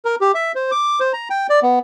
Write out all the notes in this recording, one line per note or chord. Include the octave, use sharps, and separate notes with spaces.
A#4
G4
E5
C5
D6
C5
A#5
G5
D5
B3